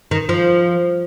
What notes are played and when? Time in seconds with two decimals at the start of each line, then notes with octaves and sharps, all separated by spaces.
0.11 D#3
0.29 F3